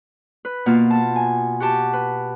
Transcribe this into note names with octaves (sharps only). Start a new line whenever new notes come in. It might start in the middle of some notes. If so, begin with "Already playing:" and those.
B4
B2 A#3 F4
A5
G#5
F#4 G4 A5
B4